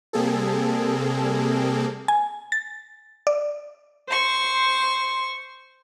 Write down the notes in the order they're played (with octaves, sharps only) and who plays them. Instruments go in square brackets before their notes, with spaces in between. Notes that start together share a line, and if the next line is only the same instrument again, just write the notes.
[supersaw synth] C3 G3 A#3 C4 G#4 A4
[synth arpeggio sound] G#5
A6
D5
[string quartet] C5 C6 C#6